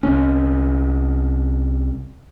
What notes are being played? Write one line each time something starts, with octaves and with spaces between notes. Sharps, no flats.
C2 C#4